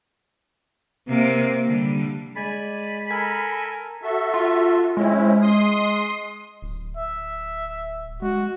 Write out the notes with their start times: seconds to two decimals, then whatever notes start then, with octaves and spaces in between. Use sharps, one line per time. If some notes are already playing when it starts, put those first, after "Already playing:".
1.08 C3 A#3
1.65 D3 G3
2.36 G#3 D5 G#5 B5
3.11 A4 A#4 G#5
4.02 F#4 A4 E5
4.34 F4
4.97 G#3 C4 C#4 E4
5.42 C6 D#6
6.62 D1
6.97 E5
8.22 G#3 F#4